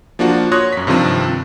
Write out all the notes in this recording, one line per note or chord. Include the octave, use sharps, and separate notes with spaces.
F3 A#3 D4 F4 F#4
C#5 C6 D#6 F#6 G#6 A#6
F#2 B6
G2 C3 D#3 F3 C4